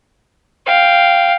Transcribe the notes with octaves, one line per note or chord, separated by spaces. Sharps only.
F5 G5